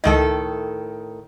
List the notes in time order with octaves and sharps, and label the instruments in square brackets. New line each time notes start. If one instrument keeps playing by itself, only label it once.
[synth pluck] C#2 D#5 [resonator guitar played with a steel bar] A2 D#3 A4